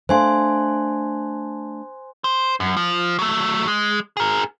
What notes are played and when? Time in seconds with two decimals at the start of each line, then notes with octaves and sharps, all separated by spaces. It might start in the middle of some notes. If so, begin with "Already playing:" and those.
0.09 A3 D4 C5 F5 G#5 C6
2.24 C5
2.60 F#2
2.77 F3
3.19 F#3 A3
3.68 G#3
4.17 G#4 A#4